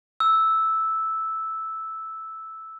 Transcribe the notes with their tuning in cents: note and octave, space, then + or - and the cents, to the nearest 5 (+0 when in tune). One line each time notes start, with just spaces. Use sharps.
E6 -5